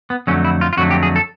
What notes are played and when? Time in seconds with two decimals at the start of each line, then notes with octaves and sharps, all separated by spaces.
0.10 B3
0.27 F2 D3 F#3 A3 C#4
0.44 E4
0.61 F4
0.73 F4
0.77 F2 D3 F#3 A3 F#4
0.91 G4
1.03 G#4
1.16 A4